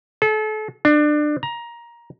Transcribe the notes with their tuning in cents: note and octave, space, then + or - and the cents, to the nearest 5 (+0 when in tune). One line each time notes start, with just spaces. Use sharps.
A4 -35
D4 +25
A#5 +15